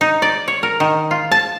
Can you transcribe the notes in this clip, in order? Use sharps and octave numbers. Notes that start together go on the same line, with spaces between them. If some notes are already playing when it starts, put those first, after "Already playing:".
D#4
D5
C#5
A#4
D#3
F4
A5